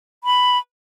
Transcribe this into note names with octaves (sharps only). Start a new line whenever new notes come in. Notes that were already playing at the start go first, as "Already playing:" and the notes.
B5